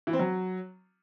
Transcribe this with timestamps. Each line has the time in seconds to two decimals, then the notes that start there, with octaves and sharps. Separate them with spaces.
0.07 E3
0.13 C4
0.19 F#3